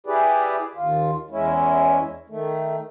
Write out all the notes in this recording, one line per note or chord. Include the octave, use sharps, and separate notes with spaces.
E4 G4 G#4 B4 D5
D#2 F4
E2 G#3 C#4 E4
D#3 A3